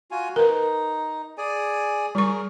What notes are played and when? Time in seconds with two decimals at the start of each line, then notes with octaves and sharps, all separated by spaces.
0.11 F4 F#4 G#5
0.36 D#4 A#4 B4
1.38 G#4 D5 G#5
2.15 G3 G#4 A#4 C#6